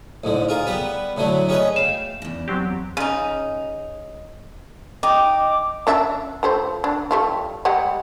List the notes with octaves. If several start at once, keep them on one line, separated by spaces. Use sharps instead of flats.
A1 G#2 D3
F4 G#4 A#4
G3 B3 B4
A2 D3 F#3 A3
C#4 G#4 B4 D#5
A3 F5 G5 E7
E2 C#3
F#3 C4 G4
C#3 D#4
D#4 D#5 G5 D6
C#4 D4 E5
F3 A3 C5
D4
G3 A3 F4
G3 G#3 F#5